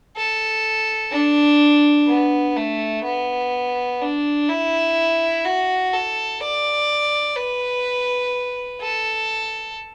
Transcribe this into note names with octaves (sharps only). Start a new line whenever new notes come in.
A4
D4
B3
A3
B3
D4
E4
F#4
A4
D5
B4
A4